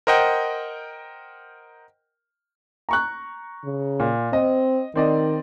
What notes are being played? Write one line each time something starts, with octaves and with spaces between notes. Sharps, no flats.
A#4 C5 D#5 F#5 G5
A#5 C#6 F#6
C#3
A#2
C4 D#5
D#3 C4 D5 D#5